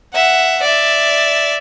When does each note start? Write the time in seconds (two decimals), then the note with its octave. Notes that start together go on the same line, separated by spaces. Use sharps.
0.14 E5 F#5
0.62 D5 E5